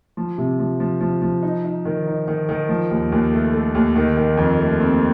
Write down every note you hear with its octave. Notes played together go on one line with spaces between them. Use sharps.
F3
C3
F3
F3
F3
F3
D#4
D#4
D#3
D#4
D#3
D#3
F3
D#2
D#2
A3
A3
D#2
D#3
D#3
F2
A3
C4